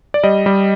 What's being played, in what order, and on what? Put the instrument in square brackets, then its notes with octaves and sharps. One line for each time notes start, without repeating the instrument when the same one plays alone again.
[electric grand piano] D5
G3 D#5
G3